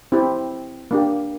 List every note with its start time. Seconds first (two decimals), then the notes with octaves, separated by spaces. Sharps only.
0.12 C4 E4 G4
0.91 A#3 D4 G4